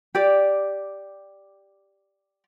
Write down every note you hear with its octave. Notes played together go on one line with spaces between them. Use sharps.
G4 D5